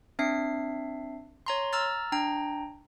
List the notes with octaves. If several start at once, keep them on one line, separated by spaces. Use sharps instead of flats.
C4 D4 E5 C7
C#5 A#5 C6
A#5 E6 F6 A6
D4 G5 A#5